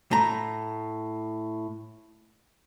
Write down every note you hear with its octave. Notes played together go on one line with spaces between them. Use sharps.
A2 A#5